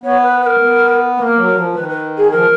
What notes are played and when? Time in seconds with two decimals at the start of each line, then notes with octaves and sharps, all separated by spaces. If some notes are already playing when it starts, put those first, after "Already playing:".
0.04 B3 C#5
0.22 B4
0.41 B4
0.46 A#4
0.60 B3
1.18 A#3 A#4 B4
1.36 F#3
1.56 F3
1.74 D#3 B4
1.89 B4
2.17 G#4
2.31 F3 A#4